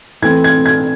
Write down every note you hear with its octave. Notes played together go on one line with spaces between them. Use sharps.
E3 A3 C4 G#6
G#6
G#6